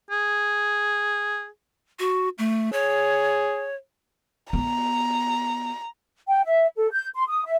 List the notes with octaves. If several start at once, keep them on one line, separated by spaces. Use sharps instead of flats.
G#4
F#4
A3
G#4 C#5
B3 A#5
G5
E5
A4
G6
C6
D#6
E5